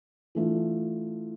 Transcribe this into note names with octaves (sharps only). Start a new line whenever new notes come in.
E3 A3 D4 F4